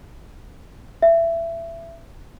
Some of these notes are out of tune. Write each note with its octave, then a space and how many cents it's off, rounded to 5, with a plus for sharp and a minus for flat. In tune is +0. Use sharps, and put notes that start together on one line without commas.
E5 +20